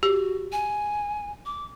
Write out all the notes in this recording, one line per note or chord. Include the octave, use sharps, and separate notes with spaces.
F#4 G4
G#5
D6